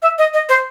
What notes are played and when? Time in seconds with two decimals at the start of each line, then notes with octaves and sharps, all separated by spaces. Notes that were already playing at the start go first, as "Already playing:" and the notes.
0.02 E5
0.18 D#5
0.34 D#5
0.49 C5